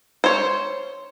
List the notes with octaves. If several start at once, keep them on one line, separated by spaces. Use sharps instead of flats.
C5 C#5